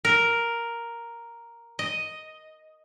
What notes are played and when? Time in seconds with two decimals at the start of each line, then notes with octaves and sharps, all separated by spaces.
0.05 A#4
1.79 D#5